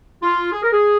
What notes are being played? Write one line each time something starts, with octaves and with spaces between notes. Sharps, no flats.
F4
G#4
A#4
G#4